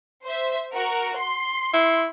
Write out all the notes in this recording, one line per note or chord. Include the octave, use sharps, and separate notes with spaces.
C5 E5
F#4 A#4
C6
E4